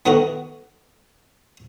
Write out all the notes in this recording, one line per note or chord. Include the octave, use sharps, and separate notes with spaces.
D#3 A3 B3 D#4 F#4 A#4